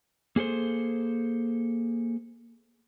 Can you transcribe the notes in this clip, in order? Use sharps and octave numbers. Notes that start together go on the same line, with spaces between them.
A#3 G#4 A4 C5